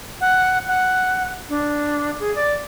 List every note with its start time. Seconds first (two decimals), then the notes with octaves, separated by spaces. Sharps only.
0.21 F#5
0.67 F#5
1.49 D4
2.19 G#4
2.35 D5